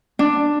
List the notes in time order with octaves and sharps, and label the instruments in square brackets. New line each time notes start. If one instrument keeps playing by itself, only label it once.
[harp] D4